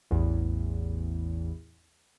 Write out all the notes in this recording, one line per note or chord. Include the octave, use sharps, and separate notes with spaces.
A1 E2